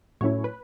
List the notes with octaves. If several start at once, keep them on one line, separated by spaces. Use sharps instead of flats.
A2 F#3 A3 C#4 E4 C#5
B4